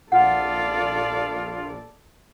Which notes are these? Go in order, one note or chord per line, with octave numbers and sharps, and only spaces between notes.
A#1 F4 A4 D5 F#5